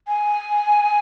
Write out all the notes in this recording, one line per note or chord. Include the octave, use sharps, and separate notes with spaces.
G#5